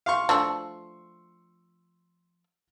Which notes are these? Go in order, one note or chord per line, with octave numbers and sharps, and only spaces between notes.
F5 C6 C#6
F3 A3 D4 C6 C#6 E6